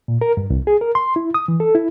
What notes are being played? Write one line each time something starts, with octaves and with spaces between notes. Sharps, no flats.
A#2
A#4
G2
C2
G#4
A#4
C6
E4
D#6
E3
A4
E4